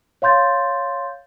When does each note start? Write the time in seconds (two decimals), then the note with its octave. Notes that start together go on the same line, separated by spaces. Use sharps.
0.22 C#5 F5 C6 G6 A6